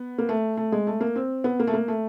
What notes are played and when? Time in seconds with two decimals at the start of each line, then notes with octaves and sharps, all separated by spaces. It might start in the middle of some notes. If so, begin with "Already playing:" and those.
Already playing: B3
0.18 A#3
0.29 A3
0.57 A3
0.72 G#3
0.87 A3
1.01 A#3
1.16 C4
1.44 B3
1.60 A#3
1.67 A3
1.74 A#3
1.88 A3